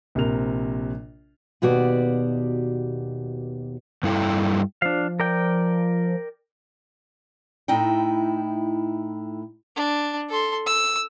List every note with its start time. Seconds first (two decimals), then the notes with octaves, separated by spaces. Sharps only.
0.15 A#1 C3 A#4 F7
1.62 D#2 B2 F#4 G4 D5
4.03 G2 G3 E4 A4 F5 G5
4.82 F3 D4 F5
5.20 A#4 D5 G5
7.68 A2 D#4 E4 G5
9.76 D4
10.29 A4 C6
10.66 E6